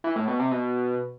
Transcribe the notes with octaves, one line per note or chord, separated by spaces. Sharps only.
E3
A2
B2
C3
B2